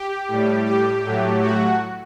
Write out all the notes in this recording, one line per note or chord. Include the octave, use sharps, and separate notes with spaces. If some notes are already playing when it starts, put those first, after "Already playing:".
Already playing: G4
A2 G3
G4
A2 F#3 A3
F#4